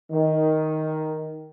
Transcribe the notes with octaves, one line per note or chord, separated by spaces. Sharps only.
D#3